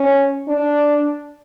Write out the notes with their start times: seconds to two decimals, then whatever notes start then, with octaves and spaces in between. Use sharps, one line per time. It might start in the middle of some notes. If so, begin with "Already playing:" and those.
Already playing: C#4
0.48 D4